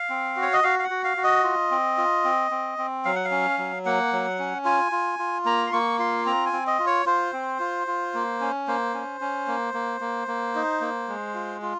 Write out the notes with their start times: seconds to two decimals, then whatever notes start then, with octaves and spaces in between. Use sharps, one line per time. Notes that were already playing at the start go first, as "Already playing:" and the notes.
Already playing: F5
0.10 C4
0.36 F#4
0.42 C#5
0.53 D#5
0.63 F#4 F5
0.79 F5
0.84 F#5
0.90 F#4
1.04 F5
1.17 F#4
1.24 D#5
1.44 F4
1.71 C4
1.98 F4
2.25 C4
2.51 C4
2.78 C4
3.05 F#3 F5
3.16 F#5
3.25 F5
3.31 C#4
3.58 F#3
3.86 A#3 F#5
4.13 F#3
4.39 C#4
4.65 F4 G#5
4.92 F4
5.19 F4
5.45 A#3 A#5
5.67 C6
5.73 A#3 C#6
5.99 F4 C6
6.26 C4 A#5
6.46 G#5
6.53 C4
6.67 D#5
6.80 F4
6.87 C#5
7.06 F4 C5
7.33 C4
7.59 F4
7.87 F4
8.14 A#3
8.41 C#4
8.68 A#3 C5
8.94 C#4
9.21 C#4
9.47 A#3
9.74 A#3
10.01 A#3
10.28 A#3
10.55 D#4
10.81 A#3
11.09 G#3
11.34 F4
11.62 F4